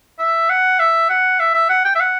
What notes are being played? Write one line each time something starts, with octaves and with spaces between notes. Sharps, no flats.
E5
F#5
E5
F#5
E5
E5
F#5
G5
E5
F#5